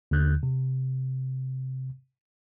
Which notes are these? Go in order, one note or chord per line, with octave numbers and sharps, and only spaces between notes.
D#2 D3 F#6 G6
C3